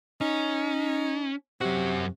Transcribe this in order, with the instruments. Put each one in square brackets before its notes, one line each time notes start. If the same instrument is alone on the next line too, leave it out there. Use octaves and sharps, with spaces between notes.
[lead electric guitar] C#4 [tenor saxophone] D#4
[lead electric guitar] F#2 F#4 [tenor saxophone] C3